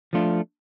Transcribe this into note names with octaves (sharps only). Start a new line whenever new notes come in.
F3 A3 D4 F4